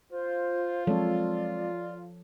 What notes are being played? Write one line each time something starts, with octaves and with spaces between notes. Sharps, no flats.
F4 C5
F3 F#3 G#3 C4 A4 C#5 D5